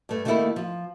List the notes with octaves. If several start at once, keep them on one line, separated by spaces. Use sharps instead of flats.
G2 A3
D#3 A3 A#3 D#4 E4 G4
F3